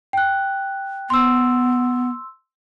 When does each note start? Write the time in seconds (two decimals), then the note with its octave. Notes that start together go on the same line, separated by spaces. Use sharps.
0.13 G5 F#6
1.10 B3 C6 E6